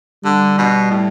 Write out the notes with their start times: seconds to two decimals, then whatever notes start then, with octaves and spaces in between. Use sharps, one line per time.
0.25 D3 G3
0.58 B2
0.91 A2